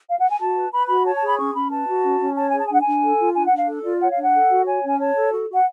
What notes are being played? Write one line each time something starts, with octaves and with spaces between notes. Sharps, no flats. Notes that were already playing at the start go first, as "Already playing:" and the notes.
F5
F#5
G#5
F#4 A5
B4
B4 B5
F#4 B5
C#5 A5
A5
G#4
B5
C#4 C#6
C#4 B5
B4 A5
F#4
C#4
C#4
C#5 A5
G#5
G#4
A5
G#5
D4 F#5
D4 G#5
A4
F4
D4 G#5
F#5
D4
F5
A4
F4 D5
C#5 F#5
F5
D4
F#5
A4
F#4
C#5 G#5
C#4
G#5
C#5 A5
A4
F#4
F#4
F#5